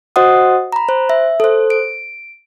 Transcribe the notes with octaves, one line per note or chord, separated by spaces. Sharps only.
F#4 C5 D#5 F#5 D#6
A#5 B5
C5
E5
A4 C5
D7